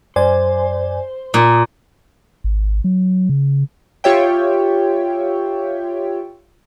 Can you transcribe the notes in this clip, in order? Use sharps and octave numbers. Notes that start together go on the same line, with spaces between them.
F#2 C5 D5 G#5
A#2 D#6
G#1
F#3
C#3
F4 G4 C#5 E5 G5